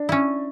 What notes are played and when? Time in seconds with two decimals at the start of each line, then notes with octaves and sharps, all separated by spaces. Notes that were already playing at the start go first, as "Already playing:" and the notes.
Already playing: D4
0.09 C#4 E4